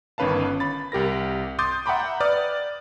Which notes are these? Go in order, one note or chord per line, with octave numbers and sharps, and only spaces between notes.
G1 D#3 C#4 B4 F5 A5
B5 A6
C2 G4 A#4 A#6
C6 D6 D#6 G6 A6
E5 F#5 G5 A#5 B5 D6
B4 D5 D#6 F6